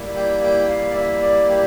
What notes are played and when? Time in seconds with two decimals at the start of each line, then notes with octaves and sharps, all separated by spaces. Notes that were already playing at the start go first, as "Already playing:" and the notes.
Already playing: G3 A#3 E4
0.16 G5
0.43 G5
0.69 F5
0.90 D5
0.96 E5
1.22 D5
1.49 G4